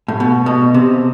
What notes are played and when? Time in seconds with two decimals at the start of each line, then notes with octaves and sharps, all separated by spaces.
0.08 A2
0.20 B2
0.46 B2
0.74 C3